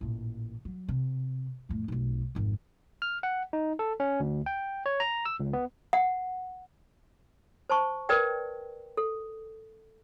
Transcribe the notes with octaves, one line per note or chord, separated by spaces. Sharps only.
A1 A#2
F#3
C3
F2 A2
F1 B1
G#1 F2
F6
F#5
D#4
A4
C#4
D2
G5
C#5
A#5
E6
C#2
B3
F#5
C5 A5 C#6
A#4 B4 D5 G5
A4